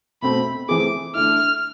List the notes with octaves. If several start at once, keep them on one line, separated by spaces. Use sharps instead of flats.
B2 A3 C4 B5
E3 A3 C4 G#4 D6
D3 A3 E4 F6